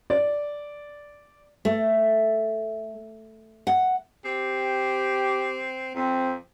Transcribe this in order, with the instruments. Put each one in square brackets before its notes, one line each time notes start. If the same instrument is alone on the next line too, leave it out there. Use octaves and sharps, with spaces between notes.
[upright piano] D5
[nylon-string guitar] A3
F#5
[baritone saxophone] C4 [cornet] G4
[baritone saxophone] F2 [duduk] C4